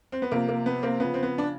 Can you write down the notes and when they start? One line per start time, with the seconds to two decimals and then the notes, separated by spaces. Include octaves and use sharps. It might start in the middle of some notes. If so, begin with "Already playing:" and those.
0.12 C4
0.22 B3
0.31 C3 F3 A#3
0.48 A#3
0.66 B3
0.83 A#3 C4
1.00 C#3 F3 B3
1.14 C4
1.23 B3
1.38 D4